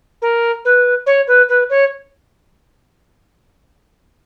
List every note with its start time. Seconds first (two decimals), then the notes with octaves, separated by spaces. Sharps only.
0.22 A#4
0.65 B4
1.06 C#5
1.27 B4
1.49 B4
1.70 C#5